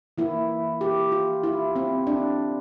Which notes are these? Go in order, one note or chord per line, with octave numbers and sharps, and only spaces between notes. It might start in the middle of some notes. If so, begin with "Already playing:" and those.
E3 A#3 E4
G4
F4
E4
C4
D4